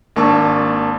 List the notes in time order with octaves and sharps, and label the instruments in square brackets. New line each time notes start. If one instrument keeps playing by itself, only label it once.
[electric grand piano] G#1 A#3 D4 A5 C#6 E6